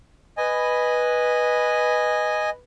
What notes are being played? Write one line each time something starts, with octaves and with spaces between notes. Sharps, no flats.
B4 D#5 G#5